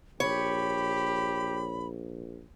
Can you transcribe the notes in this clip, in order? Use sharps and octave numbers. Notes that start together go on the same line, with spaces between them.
A#1 G4 C#5 B5